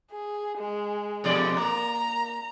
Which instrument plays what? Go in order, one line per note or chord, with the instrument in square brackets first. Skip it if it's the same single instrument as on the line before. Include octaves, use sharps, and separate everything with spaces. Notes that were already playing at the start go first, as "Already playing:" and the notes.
[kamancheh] G#4
G#3
[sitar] F2 B2 D5
[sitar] A#3 [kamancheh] A#5